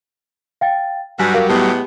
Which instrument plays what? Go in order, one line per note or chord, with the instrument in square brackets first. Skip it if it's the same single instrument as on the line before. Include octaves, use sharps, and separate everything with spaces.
[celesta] F5 G5 A6
[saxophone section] G2 F#4 [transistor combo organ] F#3 G3 [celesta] G#5 B6
[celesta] A#4 F5
[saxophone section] A2 G#3 B3 [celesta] G4